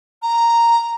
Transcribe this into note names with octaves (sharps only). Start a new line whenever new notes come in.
A#5